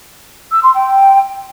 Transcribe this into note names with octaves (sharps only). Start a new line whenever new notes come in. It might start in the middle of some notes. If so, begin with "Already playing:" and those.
E6
C6
G5